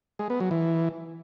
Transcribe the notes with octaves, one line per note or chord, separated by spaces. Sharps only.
G#3
B3
F#3
E3